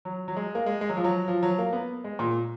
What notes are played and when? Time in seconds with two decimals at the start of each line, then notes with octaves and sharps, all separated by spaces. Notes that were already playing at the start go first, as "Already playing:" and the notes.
0.05 F#3
0.28 F#3
0.36 G#3
0.55 A#3
0.66 G#3
0.81 G#3
0.89 F#3
0.97 F3
1.04 F#3
1.28 F3
1.43 F#3
1.59 A#3
1.73 B3
2.04 G#3
2.19 A#2